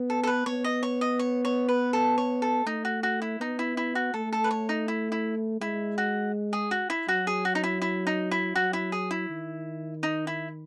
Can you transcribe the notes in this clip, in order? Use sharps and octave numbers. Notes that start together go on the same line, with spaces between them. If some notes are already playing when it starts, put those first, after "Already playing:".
Already playing: B3
A4
A4
B4
B3 C#5
D#5
C#5
D#5
C#5
C#5
B4
A4
C#5
A4
A3 D#4
F#4
F#4
E4
B3 D#4
E4
E4
F#4
A3 A4
A4
B4
C#5
D#4
E4
E4
G#3 E4
F#4
G#4
F#4
E4
F#3 F#4
G#4
F#4
D#4
E4
E4
D#4
E4
F#3 F#4
E4
G#4
E4
D#3
D#4
E4